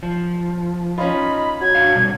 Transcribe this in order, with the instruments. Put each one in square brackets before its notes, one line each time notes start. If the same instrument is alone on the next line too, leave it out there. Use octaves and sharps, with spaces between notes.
[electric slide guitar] F3
[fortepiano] C#4 F4 [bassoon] D#4 [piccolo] B5
[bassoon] F#3 [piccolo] G#6
[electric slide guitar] D4 F#4 F5
B2 G3